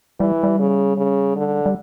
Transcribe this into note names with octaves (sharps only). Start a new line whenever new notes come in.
E3 G3
G3
C#3
C#3
D3
G3